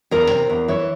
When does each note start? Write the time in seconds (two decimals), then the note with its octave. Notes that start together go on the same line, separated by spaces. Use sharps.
0.11 E2 A#4
0.30 C3
0.50 E2
0.68 E3 C#5